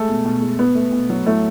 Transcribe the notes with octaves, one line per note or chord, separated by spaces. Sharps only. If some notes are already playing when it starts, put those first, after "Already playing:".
Already playing: G#3 A3 A4
B2
B2
G#3
B2 B3
A3
B2
F#3
A2 A3